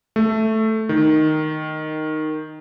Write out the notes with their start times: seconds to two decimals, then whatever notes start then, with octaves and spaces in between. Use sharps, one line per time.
0.16 A3
0.89 D#3